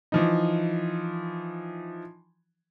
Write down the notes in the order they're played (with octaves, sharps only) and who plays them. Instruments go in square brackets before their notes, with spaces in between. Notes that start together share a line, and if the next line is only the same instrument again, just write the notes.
[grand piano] E3 F3 D#4